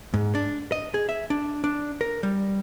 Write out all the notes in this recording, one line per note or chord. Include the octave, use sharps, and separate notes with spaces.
G#2
D4
D#5
G#4
E5
D4
D4
A#4
G3